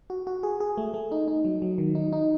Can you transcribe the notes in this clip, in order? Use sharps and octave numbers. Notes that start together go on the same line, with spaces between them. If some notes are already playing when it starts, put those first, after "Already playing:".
F#4
F#4
G#4
G#4
A3
A3
D#4
D#4
F#3
F#3
D#3
D#4
D#4